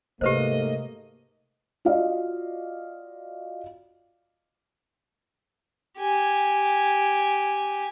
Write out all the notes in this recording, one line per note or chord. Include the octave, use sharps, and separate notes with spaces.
G#2 C3 A3 A#3 G4 B4 C5 D#5
F4 F#4 D5 D#5 F5
G4 G#5